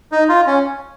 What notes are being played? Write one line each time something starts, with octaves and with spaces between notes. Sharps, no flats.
D#4
F4
C#4